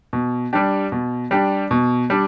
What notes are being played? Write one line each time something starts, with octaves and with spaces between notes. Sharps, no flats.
B2
G3 D4 G4
B2
G3 D4 G4
B2
G3 D4